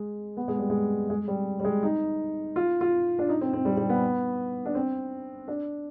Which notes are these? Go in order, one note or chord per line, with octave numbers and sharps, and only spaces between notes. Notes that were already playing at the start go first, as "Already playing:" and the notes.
Already playing: G#3
B3
G#3
G3
G#3
G#3
G3
G3
G#3
D#4
F4
F4
D4
D#4
C4
C4
G3
G3
B3
D4
C4
D4